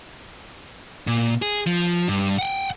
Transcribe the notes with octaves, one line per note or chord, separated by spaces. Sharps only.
A#2
G#4
F3
G2
F#5 G5